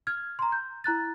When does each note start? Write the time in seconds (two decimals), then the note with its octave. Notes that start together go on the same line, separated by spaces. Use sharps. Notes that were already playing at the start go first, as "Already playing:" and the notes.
0.07 F6 G#6
0.39 A#5 C6
0.52 G6
0.84 E4 A#5 F#6 A6